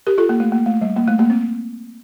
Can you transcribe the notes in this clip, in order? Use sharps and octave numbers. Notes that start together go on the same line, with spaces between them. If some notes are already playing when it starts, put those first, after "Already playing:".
G4 A#4
F4 A4
A#3
A3
A#3
A3
G3
A#3
A3
A#3
C4